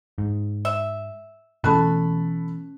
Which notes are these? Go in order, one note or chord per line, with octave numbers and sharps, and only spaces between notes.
G#2
E5
B2 E3 A3 C#4 A4 A5 B5 F#6